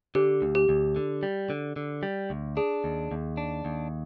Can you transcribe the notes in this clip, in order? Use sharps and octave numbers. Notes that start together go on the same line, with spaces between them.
D3 G4
D2
G4
D2
D3
G3
D3
D3
G3
D2
D4 G#4
D#2
D#2
D4
D#2